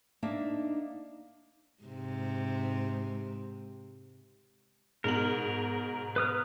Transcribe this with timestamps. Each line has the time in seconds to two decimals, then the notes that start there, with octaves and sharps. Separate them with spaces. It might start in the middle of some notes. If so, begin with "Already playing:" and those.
0.23 A#3 D4 D#4 E5 A5
1.83 G#2 C3
5.04 G#2 B2 A#4 F#7
6.16 B4 D#6 F6